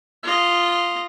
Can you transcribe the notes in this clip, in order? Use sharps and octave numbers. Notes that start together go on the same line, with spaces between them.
F4 D#5